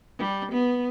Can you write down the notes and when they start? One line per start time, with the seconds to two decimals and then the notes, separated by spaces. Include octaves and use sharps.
0.19 G3
0.52 B3